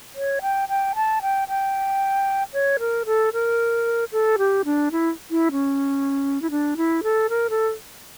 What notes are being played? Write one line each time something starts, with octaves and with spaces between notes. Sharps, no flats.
C#5
G5
G5
A5
G5
G5
C#5
A#4
A4
A#4
A4
G4
D4
E4
E4
C#4
E4
D4
E4
A4
A#4
A4